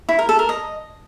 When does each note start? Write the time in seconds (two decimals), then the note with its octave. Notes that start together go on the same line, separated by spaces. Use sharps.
0.09 E4
0.19 A#4
0.29 A4
0.39 A#4
0.49 D#5